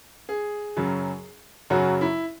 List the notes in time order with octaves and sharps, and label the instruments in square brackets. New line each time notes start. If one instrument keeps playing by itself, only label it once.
[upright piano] G#4
F#2 C#3 F#3
F#2 C#3 F#3 F#4
E4